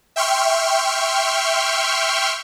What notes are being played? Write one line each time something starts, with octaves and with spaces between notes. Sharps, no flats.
E5 G5 C6 C#6 F6